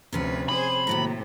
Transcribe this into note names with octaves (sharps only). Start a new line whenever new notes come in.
D2 C3 F3 C#4 B4
G#4 C5 B5
D#2 A2 C3 F#3 A#5